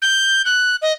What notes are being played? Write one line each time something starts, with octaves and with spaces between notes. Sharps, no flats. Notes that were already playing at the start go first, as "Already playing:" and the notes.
G6
F#6
D#5